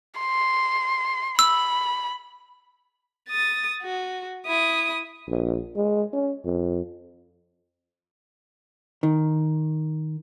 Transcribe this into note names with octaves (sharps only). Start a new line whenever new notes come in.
C6
B5 E6
D#6 A6
F#4
E4 D#6
A#1
G#3
C#4
F2
D#3